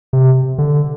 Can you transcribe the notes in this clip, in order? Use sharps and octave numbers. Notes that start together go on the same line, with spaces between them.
C3
D3